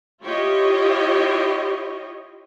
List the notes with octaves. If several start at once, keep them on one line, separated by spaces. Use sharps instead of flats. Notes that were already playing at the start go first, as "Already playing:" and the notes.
E4 F4 G4 C#5 D#5